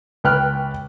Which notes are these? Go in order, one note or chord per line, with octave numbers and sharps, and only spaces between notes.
C#2 B4 G5 F6 F#6